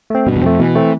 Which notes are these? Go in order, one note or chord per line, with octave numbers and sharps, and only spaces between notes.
A3 C4
G2 B2
E2
F2 A3 C4
B2 E3
A3 C4